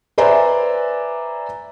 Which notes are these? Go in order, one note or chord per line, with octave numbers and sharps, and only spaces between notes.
B4 C5 D5 E5 G#5 A#5